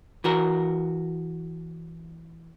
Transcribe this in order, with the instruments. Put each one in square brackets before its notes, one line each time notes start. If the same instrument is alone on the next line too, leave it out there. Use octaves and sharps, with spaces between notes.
[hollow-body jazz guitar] E3 F#4 A#4